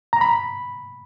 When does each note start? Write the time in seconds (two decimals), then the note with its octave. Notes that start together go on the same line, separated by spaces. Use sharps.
0.13 A#5
0.21 B5